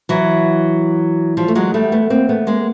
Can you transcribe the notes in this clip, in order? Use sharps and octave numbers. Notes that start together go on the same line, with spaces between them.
E3 F#3
F3 G3
A3
F#3 G#3
G3 A3
A3 B3
A#3 C4
A3 B3
G#3 A#3